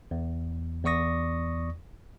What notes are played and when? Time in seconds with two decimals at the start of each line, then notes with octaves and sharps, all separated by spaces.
0.11 E2
0.85 E2 D5 C#6 D#6 A#6